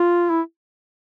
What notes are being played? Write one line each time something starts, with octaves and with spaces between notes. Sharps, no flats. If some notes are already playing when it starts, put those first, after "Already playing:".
Already playing: F4
E4